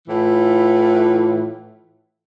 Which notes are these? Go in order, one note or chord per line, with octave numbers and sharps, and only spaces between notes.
A2 E3 F4